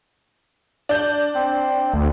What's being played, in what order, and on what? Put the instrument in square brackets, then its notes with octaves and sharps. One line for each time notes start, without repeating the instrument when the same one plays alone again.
[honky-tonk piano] D4 G6
[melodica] C4
[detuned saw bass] D2